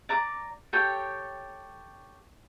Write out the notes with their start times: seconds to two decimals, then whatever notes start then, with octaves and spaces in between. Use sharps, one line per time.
0.09 D5 A#5 D6
0.73 G4 A4 C#5 G5